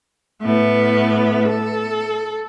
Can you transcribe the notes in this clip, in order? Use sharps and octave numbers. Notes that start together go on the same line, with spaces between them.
A2 B3
A4